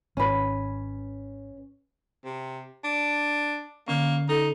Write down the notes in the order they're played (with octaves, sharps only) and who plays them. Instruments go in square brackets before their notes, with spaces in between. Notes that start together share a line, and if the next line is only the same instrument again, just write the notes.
[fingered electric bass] G#1 [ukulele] C#4 B4
[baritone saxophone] C3
D4
[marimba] D3 C#4 [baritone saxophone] A#3
[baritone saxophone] D#4 [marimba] A4